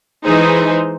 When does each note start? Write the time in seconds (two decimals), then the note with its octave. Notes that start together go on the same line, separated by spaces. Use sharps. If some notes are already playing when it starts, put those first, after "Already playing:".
0.23 E3 G#3 D#4 G#4 C5